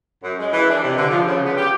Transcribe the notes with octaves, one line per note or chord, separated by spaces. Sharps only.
F#2
G#3
E3
D4
C3
D3
F3
C#3
B3
G4